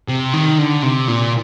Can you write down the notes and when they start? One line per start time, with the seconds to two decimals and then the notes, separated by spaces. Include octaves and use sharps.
0.08 C3
0.34 D#3
0.58 D3
0.83 C3
1.08 A#2